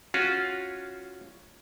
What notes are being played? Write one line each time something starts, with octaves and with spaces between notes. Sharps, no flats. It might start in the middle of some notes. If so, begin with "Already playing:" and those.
C#4 F4 F#4